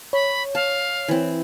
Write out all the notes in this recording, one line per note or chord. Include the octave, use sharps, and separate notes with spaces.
C#5 B5
F5 A5
E3 C4